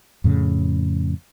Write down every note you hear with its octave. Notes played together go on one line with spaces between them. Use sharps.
F2 A2 C#3